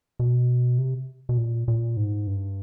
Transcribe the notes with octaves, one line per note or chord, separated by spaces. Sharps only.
B2
C3
B2
A#2
A#2
G#2
G2